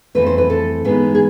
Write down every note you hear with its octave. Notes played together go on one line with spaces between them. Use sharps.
F2 E3 A3 C4 B4
C5
B4
A4
G#2 E3 G#3 B3 B4
G#4